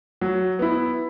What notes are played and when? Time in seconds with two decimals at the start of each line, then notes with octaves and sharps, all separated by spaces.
0.21 F#3
0.59 B3 E4